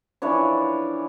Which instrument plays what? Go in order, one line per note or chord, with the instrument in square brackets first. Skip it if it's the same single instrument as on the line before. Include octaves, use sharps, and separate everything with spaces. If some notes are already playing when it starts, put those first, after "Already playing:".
[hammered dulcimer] E3 F3 D4 C#5